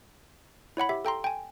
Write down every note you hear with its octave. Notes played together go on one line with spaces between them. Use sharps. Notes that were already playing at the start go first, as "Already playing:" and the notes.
E4 C#5 F#5 B5
G4 E5
A4 G5 A#5 C6
G5 G#5